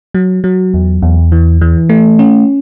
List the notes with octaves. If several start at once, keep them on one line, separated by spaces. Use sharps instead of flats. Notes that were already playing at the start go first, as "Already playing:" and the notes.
F#3
F#3
E2
E2
E3
E3
A3
C#4